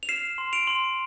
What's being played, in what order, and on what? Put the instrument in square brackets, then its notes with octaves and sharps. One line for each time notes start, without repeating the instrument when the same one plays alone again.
[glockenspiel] F7
F6 C7 E7
C6
D7 F7
C6